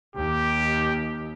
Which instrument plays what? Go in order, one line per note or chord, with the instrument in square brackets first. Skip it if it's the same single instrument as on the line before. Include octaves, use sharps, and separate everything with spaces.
[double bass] D#2 [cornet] G4